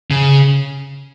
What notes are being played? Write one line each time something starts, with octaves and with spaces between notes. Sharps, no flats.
C#3